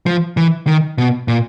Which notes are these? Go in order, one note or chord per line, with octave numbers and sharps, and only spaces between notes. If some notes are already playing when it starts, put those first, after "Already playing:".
F3
E3
D#3
B2
A#2